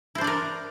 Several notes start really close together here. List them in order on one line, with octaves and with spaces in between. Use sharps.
E4 C5 D4 D5 A#4